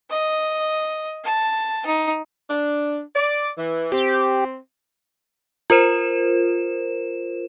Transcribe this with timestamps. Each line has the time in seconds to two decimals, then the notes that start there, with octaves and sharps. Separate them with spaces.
0.10 D#5
1.24 A5
1.86 D#4
2.49 D4
3.15 D5
3.58 E3
3.92 C4 G4
5.70 F4 A#4 C5 E7